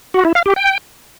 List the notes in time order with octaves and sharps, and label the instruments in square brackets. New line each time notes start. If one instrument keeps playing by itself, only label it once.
[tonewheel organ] F#4
E4
F5
G4
G5